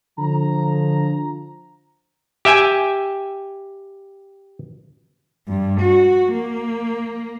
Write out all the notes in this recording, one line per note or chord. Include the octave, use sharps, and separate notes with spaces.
D3 F3 A#5
G4 E5 G5 G#5
G2
F#4
A#3